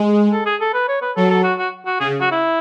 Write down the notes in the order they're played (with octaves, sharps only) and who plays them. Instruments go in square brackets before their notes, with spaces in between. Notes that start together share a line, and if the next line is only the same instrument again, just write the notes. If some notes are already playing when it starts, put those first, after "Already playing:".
Already playing: [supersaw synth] G#3
[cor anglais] A4
G#4
A4
B4
C#5
B4
[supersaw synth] F#3 [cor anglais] A4
[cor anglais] A4
F#4
F#4
F#4
[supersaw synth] C#3 [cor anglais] G#4
[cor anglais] F#4
E4